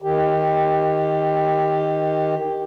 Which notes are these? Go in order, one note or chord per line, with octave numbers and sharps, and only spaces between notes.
D#3 G4